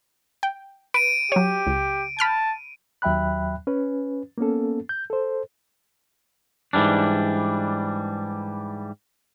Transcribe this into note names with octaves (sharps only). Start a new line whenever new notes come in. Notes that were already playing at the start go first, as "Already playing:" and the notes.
G5
B4 D7 D#7
F#3 G4 C#5
C#2
A5 B5 F6 G6
D#2 F#3 E5 G5 B5 F#6
C#4 B4
A#3 B3 C#4 A4
G6
A4 C5
G#2 E3 G3 D4